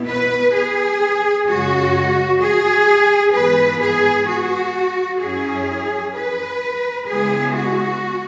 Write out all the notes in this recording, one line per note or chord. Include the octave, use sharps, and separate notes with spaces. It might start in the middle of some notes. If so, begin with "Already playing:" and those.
Already playing: B2 B3 E4
B4
G#4
F#2 C#3 G#3 F#4
G#4
G#2 E3 B3 B4
G#4
F#4
F#2 F#3 C#4 E4 G#4
B4
C#3 G#3 B3 E4 G#4
F#4